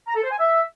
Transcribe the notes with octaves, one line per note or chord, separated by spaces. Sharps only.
A#5
A4
C5
G#5
E5